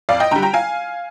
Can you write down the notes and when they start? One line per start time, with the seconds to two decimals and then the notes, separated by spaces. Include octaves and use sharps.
0.09 F2 D5 F5
0.20 D#5 G5
0.31 D3 G5 A#5
0.36 G3
0.42 G5 A#5
0.54 F5 G#5